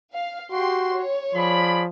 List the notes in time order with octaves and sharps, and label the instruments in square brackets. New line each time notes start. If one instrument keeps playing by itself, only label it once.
[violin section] F5
[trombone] F#4 [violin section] G4 G5 C6
[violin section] C#5
[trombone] F3 [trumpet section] G#4 D5 B5